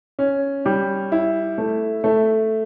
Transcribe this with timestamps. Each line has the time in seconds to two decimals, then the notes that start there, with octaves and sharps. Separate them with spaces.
0.19 C#4
0.66 G3
1.12 E4
1.58 A3
2.04 A3